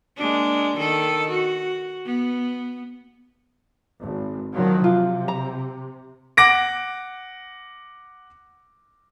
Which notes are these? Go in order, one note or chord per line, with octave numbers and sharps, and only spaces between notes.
G#3 A#3 D4
D#3 A4
F#4
B3
G#1
D#3 F3 F#3
C3 F4
A#5
F#5 D6 A#6 D7